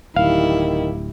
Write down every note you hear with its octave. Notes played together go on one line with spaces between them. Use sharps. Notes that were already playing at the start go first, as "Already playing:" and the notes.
D1 D#3 G3 E4 F5